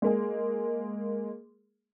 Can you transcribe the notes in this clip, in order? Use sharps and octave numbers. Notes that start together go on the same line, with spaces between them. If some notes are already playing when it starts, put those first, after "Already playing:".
G#3 A#3 G#4